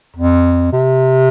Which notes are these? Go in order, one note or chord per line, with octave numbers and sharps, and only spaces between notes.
F2
C3